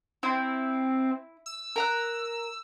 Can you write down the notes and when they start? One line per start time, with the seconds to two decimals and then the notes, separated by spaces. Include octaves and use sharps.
0.23 C4 E4
1.46 E6
1.76 A#4 A#5 F#6